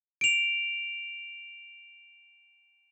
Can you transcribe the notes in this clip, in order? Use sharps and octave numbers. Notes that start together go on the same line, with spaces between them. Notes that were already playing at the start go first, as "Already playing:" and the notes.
D7 F7